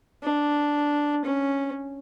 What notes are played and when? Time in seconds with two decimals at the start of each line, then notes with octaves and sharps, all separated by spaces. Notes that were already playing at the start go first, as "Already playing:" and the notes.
0.23 D4
1.25 C#4